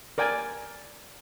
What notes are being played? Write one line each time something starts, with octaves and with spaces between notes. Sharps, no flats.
A#4 D5 G5 G#5